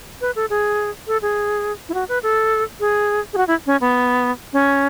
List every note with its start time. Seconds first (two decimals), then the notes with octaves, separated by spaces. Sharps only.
0.21 B4
0.36 A4
0.50 G#4
1.07 A4
1.22 G#4
1.89 E4
1.94 F#4
2.09 B4
2.23 A4
2.80 G#4
3.33 G#4
3.37 F#4
3.48 E4
3.66 C#4
3.81 B3
4.53 C#4